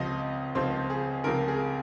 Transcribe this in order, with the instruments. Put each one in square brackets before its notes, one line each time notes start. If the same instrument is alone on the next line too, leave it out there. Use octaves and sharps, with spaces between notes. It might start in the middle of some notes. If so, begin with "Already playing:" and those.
Already playing: [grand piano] C#2 C3 F3 D#5
C#2 C3 F3 C5
G#4
C#2 C3 F3 A#4
G#4